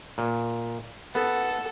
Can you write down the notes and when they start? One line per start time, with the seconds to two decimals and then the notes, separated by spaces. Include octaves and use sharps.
0.18 A#2
1.15 B3 A4 F#5